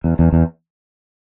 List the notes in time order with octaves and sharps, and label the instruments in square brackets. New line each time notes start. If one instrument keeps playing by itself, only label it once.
[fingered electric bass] E2
E2
E2